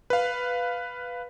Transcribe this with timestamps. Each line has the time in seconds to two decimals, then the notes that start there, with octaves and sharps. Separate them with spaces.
0.10 B4 F5